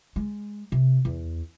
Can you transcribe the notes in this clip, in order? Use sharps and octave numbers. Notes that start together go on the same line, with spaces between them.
G#3
C3
E2